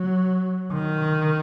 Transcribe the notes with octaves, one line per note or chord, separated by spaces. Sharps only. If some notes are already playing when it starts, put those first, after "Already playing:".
Already playing: F#3
D#3